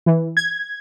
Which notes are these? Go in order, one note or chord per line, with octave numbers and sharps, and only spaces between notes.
E3
G#6